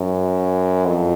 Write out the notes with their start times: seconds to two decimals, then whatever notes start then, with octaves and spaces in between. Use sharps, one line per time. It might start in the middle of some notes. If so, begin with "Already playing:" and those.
Already playing: F#2
0.85 F2